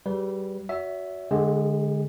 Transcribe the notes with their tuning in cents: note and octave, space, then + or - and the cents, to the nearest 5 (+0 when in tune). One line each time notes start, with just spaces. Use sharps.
G3 -25 G#4 -30 B4 -5
F#4 +0 C#5 +40 E5 +0
D3 +0 G#3 +10 G#4 -40